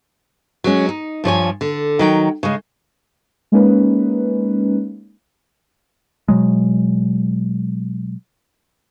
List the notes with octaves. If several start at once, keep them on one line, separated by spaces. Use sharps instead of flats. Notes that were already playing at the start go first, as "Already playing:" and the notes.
F#3 G#3 C#4
D#4
G2 F3 C#5 G#5
D3
D#3 F#3 G5
C#3 G#3
G#3 A#3 C#4 D#4 B4
B2 F#3 G#3